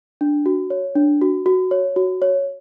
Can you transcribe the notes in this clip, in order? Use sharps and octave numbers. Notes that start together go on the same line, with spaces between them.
D4
F#4
C#5
D4
F#4
F#4
C#5
F#4
C#5